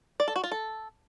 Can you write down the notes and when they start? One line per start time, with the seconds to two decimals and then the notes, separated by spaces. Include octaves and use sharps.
0.20 D5
0.28 A4
0.36 F#4
0.44 F4
0.52 A4